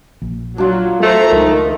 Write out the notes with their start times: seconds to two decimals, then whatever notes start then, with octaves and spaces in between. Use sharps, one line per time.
0.22 A#1
0.58 F#3 D4 F4
1.02 A3 F4 C5 A#5
1.32 C#2 D#3 F#3